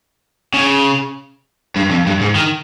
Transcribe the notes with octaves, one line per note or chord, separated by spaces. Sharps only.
C#3
G2
F2
G2
G#2
D#3